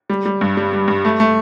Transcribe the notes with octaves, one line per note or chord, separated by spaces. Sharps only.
G3
G3
G2
G3
G3
G2
A3
A3